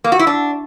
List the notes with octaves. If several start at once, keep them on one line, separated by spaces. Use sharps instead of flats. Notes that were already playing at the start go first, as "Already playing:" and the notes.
A#3
F#4
E4
D4